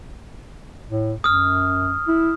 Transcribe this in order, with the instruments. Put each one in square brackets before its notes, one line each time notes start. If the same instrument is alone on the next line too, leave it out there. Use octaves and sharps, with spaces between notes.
[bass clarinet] A2
[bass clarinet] F#2 [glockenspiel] D#6 F6
[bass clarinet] E4